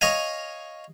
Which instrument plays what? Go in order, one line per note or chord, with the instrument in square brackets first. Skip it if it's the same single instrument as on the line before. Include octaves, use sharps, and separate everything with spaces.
[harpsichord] C#5 D#5 F5 G#5